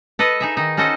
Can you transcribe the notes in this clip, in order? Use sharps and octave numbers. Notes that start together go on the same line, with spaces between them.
A4 B4 D#5
D#4 G#4 E5
D#3 D#4
C#4 F#4 A4 C5 D#5